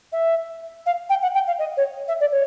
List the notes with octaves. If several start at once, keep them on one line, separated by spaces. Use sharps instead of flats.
E5
F5
G5
F#5
G5
F5
D#5
C#5
E5
D5
C#5